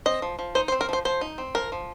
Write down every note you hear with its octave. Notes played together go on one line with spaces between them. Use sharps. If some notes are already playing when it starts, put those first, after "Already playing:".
C4 D#5
F3
F3
D#4 C5
C5
C4
A#4
F3 C5
F3 C5
D#4
C4
F3 A#4
F3